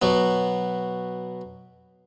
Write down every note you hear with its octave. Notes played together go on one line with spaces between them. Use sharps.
B2 F#3 B3